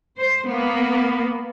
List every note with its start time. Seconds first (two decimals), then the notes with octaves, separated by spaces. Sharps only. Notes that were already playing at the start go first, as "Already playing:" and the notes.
0.18 C5
0.48 A#3 B3